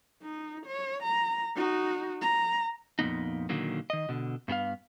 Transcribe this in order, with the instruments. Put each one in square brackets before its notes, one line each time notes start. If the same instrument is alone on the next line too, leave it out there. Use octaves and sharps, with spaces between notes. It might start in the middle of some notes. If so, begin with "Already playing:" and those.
[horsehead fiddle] D#4
C#5
A#5
D#4 F#4
A#5
[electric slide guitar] F2 A#2 C#3 B3 D#4
A#2 D3 D#3 F#3 A#3
D#3 D#5
B2 D3
G2 B3 G4 F5